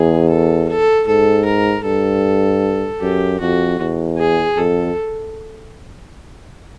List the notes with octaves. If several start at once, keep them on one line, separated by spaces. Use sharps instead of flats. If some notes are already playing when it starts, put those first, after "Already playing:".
Already playing: E2 G#4
A4
A4
G#2 A4
A#4
G2 A4
F#2 G4
F2 F#4
E2
G#4
F2 A4